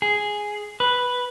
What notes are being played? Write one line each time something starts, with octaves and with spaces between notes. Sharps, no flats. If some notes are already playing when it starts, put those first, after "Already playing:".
G#4
B4